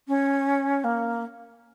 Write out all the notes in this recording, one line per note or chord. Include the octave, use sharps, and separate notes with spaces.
C#4
A#3